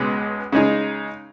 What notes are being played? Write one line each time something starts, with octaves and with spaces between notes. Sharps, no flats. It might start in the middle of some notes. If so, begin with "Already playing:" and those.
Already playing: C#2 B2 G#3
C#3 G#3 D#4